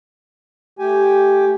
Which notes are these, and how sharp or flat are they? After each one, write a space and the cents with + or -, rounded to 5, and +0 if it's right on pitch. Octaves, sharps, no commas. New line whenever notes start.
A3 +0 G4 +0 G#5 +0